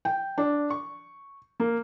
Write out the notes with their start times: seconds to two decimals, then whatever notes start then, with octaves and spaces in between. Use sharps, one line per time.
0.05 G5
0.38 D4
0.70 C#6
1.60 A#3